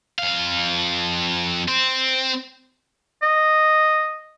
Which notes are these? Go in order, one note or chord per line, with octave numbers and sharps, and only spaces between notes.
F2 F5
C4
D#5